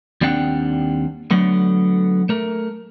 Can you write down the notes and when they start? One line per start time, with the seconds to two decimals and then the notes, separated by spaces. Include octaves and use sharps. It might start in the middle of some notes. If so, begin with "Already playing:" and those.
0.21 D#2 G3 C4 D4 F#5 G5
1.31 D3 F#3 A3 B3
2.29 A3 A#4